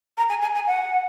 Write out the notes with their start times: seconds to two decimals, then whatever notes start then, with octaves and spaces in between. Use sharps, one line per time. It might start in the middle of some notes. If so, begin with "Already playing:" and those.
0.18 A#5
0.29 G#5
0.42 G#5
0.55 G#5
0.67 F#5